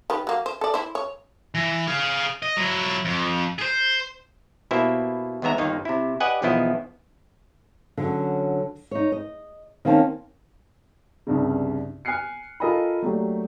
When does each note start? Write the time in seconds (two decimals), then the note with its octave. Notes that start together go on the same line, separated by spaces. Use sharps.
0.10 D#3 G4 B4
0.27 F#3 A#3
0.46 C5
0.61 A4 D5
0.74 E4 C5
0.95 C#5
1.55 E3
1.87 G#4 F5
2.42 D#5
2.57 F#3 E4
3.05 F2
3.59 G#4 C5
4.71 B2 A#3 E4 G4 C5 E5
5.42 D#2 G#3 B3 E5 A#5
5.58 G1 D#2 D#3 A#3 D#4
5.85 C3 E4
6.20 G4 B4 D5 D#5 F#5 G#5
6.42 B1 E2 F3 B3 E4 D#5
7.97 D3 F#3 C#4
8.91 D#4 C#5
9.12 D#5
9.85 D#3 A#3 C4 C#4 A5
11.27 C2 G2 C#3
12.05 G#5 F6 F#6 C7 C#7
12.60 F4 A4 A#4 D#5 G#5 B5
13.02 F#3 A3 A#3 D4 G4